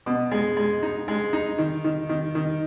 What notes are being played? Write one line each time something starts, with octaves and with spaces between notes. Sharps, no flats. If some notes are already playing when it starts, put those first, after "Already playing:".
B2
G#3
G#3
D#4
G#3
D#4
D#3
D#3
D#3
D#3